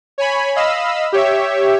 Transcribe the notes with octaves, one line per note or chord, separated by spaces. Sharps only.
C#5 G#5 B5
D#5 F5 B5 E6
G4 C#5 E5